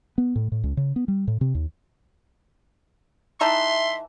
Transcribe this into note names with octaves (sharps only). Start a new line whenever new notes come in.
B3
A2
A2
C#2
C#3
B3
G3
A2
C3
D#2
E3 D#4 A4 E5 C6